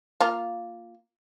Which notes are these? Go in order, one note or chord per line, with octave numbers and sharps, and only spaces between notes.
A#3 F4 A#5